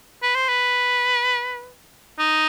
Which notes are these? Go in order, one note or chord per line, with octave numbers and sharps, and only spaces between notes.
B4
C5
B4
D#4